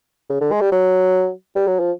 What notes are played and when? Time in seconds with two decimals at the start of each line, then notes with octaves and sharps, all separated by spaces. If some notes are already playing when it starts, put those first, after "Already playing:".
0.30 C#3
0.41 D3
0.51 G#3
0.61 G3
0.72 F#3
1.55 G3
1.67 F#3
1.79 F3